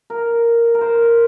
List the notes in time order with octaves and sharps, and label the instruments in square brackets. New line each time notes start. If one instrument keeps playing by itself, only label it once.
[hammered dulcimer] A#4
A#4
C5